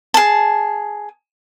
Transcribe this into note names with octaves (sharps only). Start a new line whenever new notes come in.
G#4 A5